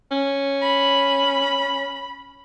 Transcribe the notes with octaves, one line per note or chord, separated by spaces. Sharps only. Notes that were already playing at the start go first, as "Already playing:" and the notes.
C#4
B5